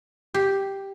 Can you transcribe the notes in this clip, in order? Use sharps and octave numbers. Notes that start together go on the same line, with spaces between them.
G4